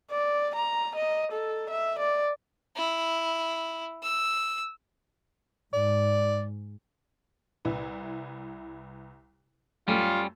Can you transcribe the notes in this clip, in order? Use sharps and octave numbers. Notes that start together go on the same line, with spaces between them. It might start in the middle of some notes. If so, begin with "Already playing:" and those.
D5
A#5
D#5
A4
E5
D5
E4
E6
G#2 D5
C2 E4 B4
F#2 G3 A3 C#4 F4